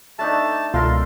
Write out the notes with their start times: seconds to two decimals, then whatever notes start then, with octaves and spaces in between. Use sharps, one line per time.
0.19 A3 D4 D#4 A5
0.74 C#2 B2 F4 A4 A#4 F5 C6